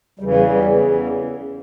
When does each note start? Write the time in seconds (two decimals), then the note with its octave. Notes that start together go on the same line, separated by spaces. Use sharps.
0.19 E2 C#3 E3 G3
0.34 G3
0.49 G3
0.64 E2 C#3 E3